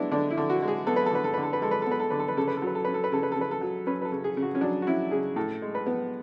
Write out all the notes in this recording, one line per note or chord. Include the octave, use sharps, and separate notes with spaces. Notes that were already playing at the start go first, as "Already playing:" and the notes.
Already playing: G#3 B3 D4 E4
D3 D4
E4
D3
F#4
G#3
G#4
B3 A4
B4
A4
D3 B4
A4
D3 B4
A4
B4
G#3 A4
B4
B3 A4
B4
A4
D3 B4
A4
B4
C#3 A4
B4
A4
F#3 B4
A4
C#4 B4
A4
B4
C#3 A4
B4
A4
C#3 B4
A4
F#3
C#4 B4
B4
A4
C#3
G#4
C#3
F#4
C#4
F#3 D4
F#4
C#4 E4
C#3 G#4
A2 A4
G#3
B4
B3